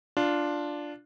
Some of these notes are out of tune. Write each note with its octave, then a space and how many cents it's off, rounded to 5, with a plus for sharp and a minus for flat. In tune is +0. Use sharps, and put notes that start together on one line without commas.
D4 +0 F4 +0